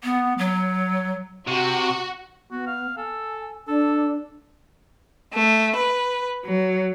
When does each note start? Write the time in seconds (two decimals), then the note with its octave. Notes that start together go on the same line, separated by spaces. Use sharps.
0.03 B3
0.38 F#3
1.47 C3 F#4
2.51 B3 F#4
2.67 F5
2.97 A4 G#5
3.68 D4 A4
5.34 A3
5.76 B4
6.44 F#3